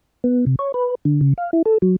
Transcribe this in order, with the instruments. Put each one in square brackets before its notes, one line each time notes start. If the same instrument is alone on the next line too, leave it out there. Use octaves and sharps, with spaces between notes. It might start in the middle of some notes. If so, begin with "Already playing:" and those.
[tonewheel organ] B3
C3
C#5
B4
D3
C#3
F5
E4
A4
F#3